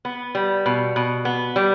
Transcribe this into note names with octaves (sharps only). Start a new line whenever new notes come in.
B3
G3
B2
B2
B3
G3